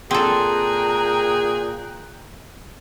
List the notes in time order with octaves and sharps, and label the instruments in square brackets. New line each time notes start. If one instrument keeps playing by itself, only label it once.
[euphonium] A#2 [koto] C4 A4 [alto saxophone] G#4 [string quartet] G5 A#5 F#6